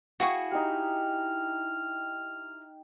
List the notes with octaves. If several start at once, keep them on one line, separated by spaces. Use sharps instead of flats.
E4 F#4 G#4 F5 G5 C#6
D#4 G4 F6